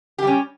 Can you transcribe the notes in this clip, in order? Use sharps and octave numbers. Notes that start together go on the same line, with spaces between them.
G3 C#4 G4